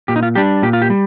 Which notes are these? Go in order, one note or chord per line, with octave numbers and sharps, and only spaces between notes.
A#2 G4
D#4
F4
G3 D4 G4
A#2 G4
F4
G4
G3